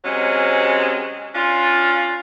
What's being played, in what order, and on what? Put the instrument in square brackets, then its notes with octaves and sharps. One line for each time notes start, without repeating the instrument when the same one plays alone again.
[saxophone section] C3 F#3 G#3 C4 C#4
C#4 D4 F4